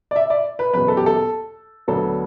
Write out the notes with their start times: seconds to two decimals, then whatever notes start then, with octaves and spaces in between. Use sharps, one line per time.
0.11 D5
0.16 E5
0.30 D5
0.59 B4
0.74 F#1 E2 B2 B4
0.88 A4
0.97 G4
1.06 A4
1.88 D2 D3 F#3 B3 A4